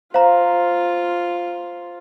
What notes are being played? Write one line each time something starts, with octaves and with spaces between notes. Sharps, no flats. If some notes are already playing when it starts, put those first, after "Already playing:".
F4 C5 F5 A#5